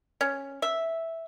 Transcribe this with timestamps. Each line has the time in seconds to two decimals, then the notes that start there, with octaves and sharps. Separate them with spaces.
0.21 C#4
0.62 E5